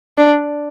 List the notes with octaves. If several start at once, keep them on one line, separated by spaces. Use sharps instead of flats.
D4